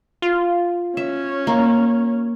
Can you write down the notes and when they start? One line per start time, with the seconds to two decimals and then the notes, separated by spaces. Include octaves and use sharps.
0.22 F4
0.97 C#4 E5
1.47 A#3